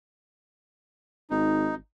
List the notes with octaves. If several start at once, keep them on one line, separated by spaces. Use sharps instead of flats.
G#1 D#4